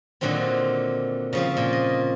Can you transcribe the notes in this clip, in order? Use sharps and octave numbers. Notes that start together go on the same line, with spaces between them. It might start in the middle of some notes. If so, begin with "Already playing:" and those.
A#2 D3 D#3 F#3 C4
C#3 F3 C4
A#2
D#5